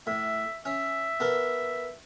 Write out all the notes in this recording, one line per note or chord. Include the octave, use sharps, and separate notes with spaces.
A2 E5
C#4 E5
B3 A4 A#4